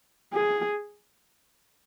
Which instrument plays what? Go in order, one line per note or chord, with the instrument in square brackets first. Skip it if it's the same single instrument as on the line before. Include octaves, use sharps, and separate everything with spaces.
[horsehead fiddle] G#4